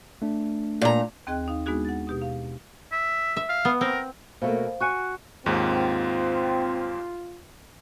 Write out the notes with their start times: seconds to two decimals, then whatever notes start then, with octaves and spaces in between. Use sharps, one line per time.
0.22 A3 D4
0.81 A#2 A#5
1.27 D#2 C4 G#4 D#5 G5 F#6
1.48 D#4 F5
1.66 G#3 B3 D4 D#4 F#4 G#4
1.85 F#5 A6
2.07 B2 G4 D#6
2.22 F5
2.92 E5
3.37 E5
3.49 F5
3.65 B3
3.81 C4 A#4
4.42 B2 A3 A#3 C5 F5
4.81 F#4 G#5 C#6 F#6 C#7
5.46 D#2 G#2 C4 F4